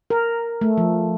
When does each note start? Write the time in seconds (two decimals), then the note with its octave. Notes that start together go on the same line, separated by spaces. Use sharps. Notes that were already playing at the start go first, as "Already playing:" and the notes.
0.10 A#4
0.61 A3
0.78 F3